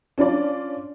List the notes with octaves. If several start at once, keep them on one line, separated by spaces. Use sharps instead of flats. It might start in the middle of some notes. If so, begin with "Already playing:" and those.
C#4 D4 F4 D5